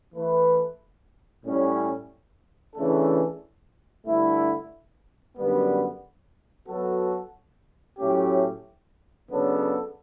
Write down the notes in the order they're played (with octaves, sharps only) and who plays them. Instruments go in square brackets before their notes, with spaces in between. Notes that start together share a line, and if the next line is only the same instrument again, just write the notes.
[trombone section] E3 A3 E4 B4
A2 G3 C#4
C#3 E3 A3 D4 A4
G2 D3 A3 E4
F#2 D3 G3 B3
F#3 B3 F#4 A4
A2 F#3 A3 C#4 G4
C#3 F#3 B3 D4 A4